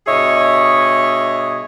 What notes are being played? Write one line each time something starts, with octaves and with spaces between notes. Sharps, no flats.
G2 B2 G#4 C#5 D#5 E5